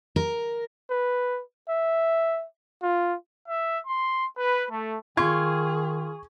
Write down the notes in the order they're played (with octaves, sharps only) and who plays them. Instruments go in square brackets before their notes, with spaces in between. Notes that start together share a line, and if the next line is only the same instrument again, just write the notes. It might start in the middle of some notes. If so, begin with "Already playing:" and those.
[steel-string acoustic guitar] A#4
[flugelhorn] B4
E5
F4
[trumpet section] E5
C6
B4
A3
[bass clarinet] D#3 [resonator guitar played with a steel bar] F4 [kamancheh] G#4 [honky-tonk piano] C#6 G#6